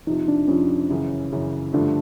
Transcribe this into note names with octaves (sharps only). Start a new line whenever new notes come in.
F2 C3 F3 D#4
D4
F2 C3 F3 C#4
F#2 C#3 E3
F#2 C#3 E3
G2 D3 F3 A3 D4